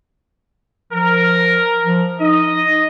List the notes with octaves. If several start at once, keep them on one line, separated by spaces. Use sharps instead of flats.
F3 A#4
F3
D#4 D#5